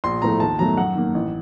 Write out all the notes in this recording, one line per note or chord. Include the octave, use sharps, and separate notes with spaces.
A#1 C6
A2 F3 A3 A#5
D#2 A5
D#3 F#3 A3 A#5
F#2 F#5
D#3 A#3
A1